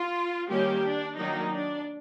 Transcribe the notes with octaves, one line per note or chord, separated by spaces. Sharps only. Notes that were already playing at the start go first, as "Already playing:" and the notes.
Already playing: F4
D#3 G3 A#3 C#4 G4
D4
D#3 F#3 A#3 D4 D#4
D4